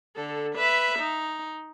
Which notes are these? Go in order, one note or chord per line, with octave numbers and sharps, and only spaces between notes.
D3 A4
B4 E5
D#4